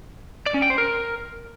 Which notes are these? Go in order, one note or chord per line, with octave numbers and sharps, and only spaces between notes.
D5
C#4
G5
C5
A#4